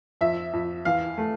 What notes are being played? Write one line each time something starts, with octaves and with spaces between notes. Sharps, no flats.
F2 E5
F2
E2 F5
A3